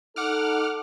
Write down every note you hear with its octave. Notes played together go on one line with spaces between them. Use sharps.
D#4 A4 F#5 D6 F6